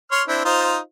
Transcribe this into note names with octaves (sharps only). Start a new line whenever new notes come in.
C#5 C6 F6
C4 D4 E4
D#4 F4 C5